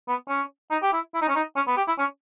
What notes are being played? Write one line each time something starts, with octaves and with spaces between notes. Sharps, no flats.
B3
C#4
D#4
G4
E4
E4
D#4
C#4
D#4
C#4
B3
G4
E4
C#4